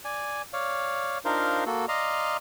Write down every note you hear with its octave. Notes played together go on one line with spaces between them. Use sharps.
D5 G#5
C#5 D5 F5
D4 D#4 F4 A#4 C5 F5
A#3 F#4 A4
D5 D#5 F5 A#5 C6